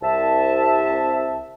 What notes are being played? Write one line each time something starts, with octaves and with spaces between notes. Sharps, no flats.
C2 C3 E5 A5